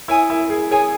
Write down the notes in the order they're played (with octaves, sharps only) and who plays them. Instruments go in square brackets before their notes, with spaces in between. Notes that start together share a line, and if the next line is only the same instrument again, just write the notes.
[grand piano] E4 [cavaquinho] C#5 G#5 D#6
[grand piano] E4
G#4
[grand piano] G#4 [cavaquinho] C#5 G#5 D#6